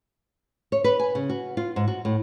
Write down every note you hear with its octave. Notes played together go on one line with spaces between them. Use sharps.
C#5
B4
G#5
C#3
F#4
F4
G#2
F#4
A2